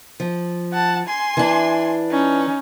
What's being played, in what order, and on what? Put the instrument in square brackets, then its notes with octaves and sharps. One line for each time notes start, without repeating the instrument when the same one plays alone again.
[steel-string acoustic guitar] F3
[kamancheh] F#5 A5
G#5 C6
[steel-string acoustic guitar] E3 D4
[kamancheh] C#4 D#4